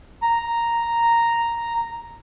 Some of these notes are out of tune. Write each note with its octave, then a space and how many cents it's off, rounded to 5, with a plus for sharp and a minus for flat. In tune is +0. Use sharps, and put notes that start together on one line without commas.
A#5 +0